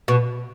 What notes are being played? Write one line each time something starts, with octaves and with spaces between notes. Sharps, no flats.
B2